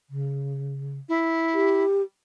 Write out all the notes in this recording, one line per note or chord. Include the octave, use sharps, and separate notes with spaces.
C#3
E4
G4